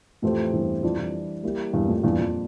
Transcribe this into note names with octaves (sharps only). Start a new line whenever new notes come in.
F2 A2 E3 A3 C4 G4 C5
E2 G2
F2 E3 G3 D4
F2
G3 A#3 E4 G4
E2 G2
F2 A2
E2 G2 A#2 G3 D4 F4
F2